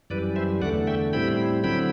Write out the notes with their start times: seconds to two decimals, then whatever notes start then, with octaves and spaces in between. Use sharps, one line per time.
0.10 F#2 E3 G3 B4 D5
0.36 C5 E5
0.62 E2 D3 A3 D5 F#5
0.87 E5 G5
1.13 A2 G3 C4 E4 G5 B5
1.64 D3 F#3 C4 E4 G5 B5